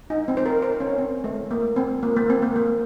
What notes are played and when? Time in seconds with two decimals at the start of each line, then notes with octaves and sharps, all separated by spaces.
0.10 D#4
0.28 C4
0.37 C5
0.46 A#4
0.62 C5
0.80 C#4
0.98 C4
1.24 A3
1.51 A#3
1.76 C4
2.03 A#3
2.16 A#3
2.30 C4
2.42 A#3
2.56 A#3